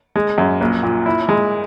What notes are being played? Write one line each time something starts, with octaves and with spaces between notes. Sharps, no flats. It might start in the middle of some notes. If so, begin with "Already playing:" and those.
G#3
F#2
A#1
A#2
E4
G#3